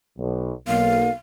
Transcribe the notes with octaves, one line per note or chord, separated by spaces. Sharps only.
B1
B1 A#3 F5